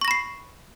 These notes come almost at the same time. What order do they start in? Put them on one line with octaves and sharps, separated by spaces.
C#6 A#6 B5 C7